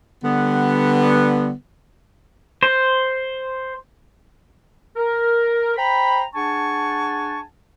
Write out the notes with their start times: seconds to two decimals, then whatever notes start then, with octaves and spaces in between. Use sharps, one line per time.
0.23 D3 G3 B3
2.63 C5
4.96 A#4
5.76 C5 G5 A#5 B5
6.35 D4 G#4 F#5 G#5 A5 C#6